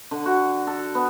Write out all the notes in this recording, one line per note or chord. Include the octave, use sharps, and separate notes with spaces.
D3
F#4
A4
B3